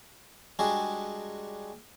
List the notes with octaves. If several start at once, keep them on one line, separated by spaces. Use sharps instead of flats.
G3 G#3 D4 F#4 G#4